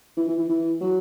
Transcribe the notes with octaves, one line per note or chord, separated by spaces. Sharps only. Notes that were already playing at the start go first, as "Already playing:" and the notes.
E3
E3
E3
E3
F#3